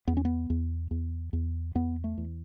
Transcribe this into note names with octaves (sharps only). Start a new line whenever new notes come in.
E2 B3
C#4
B3
E2
E2
E2
E2 B3
A3
E2